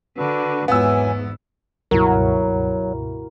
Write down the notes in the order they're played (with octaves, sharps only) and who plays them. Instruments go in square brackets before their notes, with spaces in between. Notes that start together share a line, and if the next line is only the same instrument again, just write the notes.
[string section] D3 [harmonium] D4 F#4 B4
[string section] G#1 E2 G#2 [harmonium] E3 F#3 G#5 [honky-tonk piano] B3 E6
[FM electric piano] C#2 G2 B2 [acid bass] F#3 [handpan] E4 F#4 A#4